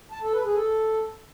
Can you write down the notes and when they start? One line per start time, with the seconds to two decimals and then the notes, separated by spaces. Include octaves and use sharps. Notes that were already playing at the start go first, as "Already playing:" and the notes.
0.12 A5
0.22 A4
0.33 B4
0.44 G#4
0.55 A4